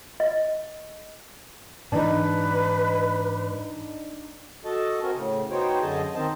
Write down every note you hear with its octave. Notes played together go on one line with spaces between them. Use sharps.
D#5
G#2 E3 D4 D#4 B4
F#4 A4 D#5 A5
C4 F#4 A#4 G#5
A2 C#3
B3 D#4 F#4 C5 C#5 G5
F#2 D3 G#4 D#5 G#5 A5
D#3 C4 C5 D#5 A5